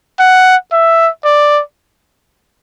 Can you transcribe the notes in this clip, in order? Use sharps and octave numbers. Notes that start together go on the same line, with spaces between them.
F#5
E5
D5